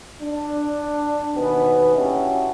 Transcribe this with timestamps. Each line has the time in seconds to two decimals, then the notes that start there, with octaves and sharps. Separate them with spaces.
0.22 D4
1.36 D#2 B2 B3 B4 G#5
1.96 C#4 D4 E4 F#4 G4